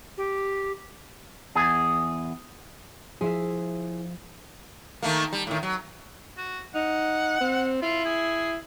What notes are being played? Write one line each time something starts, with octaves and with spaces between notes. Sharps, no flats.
G4
E2 G#4
F3 E4 G#4 E5
D#3 A3 A#3
G3
A2 D#3
F#3
F#4
D#4 F#5
C4
E4 F4
G#4